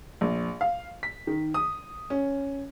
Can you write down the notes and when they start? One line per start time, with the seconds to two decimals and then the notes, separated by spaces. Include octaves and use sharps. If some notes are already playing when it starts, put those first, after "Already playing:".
0.21 A#1
0.61 F5
1.03 B6
1.27 D#3
1.54 D#6
2.10 C#4